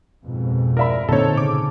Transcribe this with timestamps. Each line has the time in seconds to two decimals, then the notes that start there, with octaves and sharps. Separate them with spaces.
0.24 F2 G#2 B2
0.77 A#4 D5 E5 B5
1.09 A#2 D3 C4 D#4 A4 C#5 A5
1.37 C#3 D6